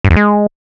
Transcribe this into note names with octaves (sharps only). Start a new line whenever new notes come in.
G2
E2
G#3